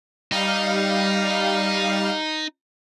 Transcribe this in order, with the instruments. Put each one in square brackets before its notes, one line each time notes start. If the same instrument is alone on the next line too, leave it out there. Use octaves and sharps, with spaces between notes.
[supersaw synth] G3 F5 [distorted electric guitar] D#4